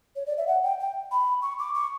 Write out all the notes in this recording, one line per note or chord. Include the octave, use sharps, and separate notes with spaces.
C#5
D5
E5
F#5
G5
G5
B5
C#6
D6
C#6